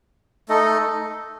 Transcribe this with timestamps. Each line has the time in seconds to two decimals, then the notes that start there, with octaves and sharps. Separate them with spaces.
0.49 A3 D#4 A4 D#5